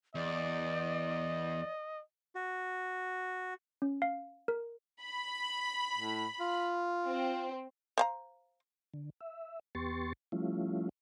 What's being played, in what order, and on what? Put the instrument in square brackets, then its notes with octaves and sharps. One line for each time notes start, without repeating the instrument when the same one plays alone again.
[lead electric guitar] E2 [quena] D5 [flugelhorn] D#5
[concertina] F#4
[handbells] C#4
F5
A#4
[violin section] B5
[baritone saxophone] A2
F4
[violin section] C4
[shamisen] C5 F5 A#5
[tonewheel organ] D3
E5
E2 B3 G4 C6 C#6 A6
F3 G3 A3 C#4 E4 F4